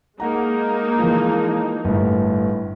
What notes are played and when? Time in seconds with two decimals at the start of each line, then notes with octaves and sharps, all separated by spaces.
0.20 G#3 A#3 D#4 F#5 A#5
0.99 E3 F3
1.85 G1 A2